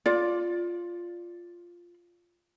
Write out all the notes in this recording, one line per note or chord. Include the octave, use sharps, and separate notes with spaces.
F4 D5